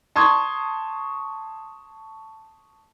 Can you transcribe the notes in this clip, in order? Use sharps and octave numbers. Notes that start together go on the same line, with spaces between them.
A5 C6 C#6 D#6 G#6